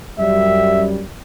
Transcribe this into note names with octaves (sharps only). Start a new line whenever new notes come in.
F#2 G3 E5